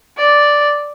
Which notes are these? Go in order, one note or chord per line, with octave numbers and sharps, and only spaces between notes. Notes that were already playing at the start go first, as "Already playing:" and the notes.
D5